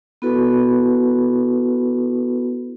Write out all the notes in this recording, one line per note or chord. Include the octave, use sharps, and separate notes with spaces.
B3 E4 F#4 A4 B4